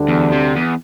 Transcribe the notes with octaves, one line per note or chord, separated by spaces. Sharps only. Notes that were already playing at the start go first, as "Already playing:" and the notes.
Already playing: D2 D3 G3 D4
E2
C3
E2